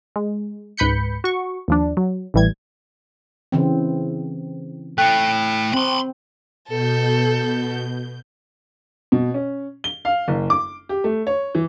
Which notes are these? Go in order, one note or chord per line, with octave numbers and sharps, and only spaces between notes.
G#3
C#2 G#2 B4 B5 G6 C#7
F#4 C#6
D#2 F3 D4
F#3
A1 A2 E3 G3 G#6
C#3 E3 C4
A3 E4 G5 F#6
C4 B5 C6
B2 A4 G6
B2
C#4
G7
F5
F#1
D6
G4
A3
C#5
E3